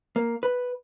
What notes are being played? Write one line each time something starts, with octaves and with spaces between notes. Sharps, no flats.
A#3
B4